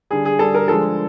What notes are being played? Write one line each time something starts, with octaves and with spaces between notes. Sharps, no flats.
D3 G3 G#4
G#4
D3 G3 A4
A#4
D3 F3 G#3 A4